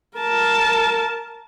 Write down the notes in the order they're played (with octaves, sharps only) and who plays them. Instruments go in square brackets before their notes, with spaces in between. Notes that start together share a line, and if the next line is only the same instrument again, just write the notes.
[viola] A#4 A5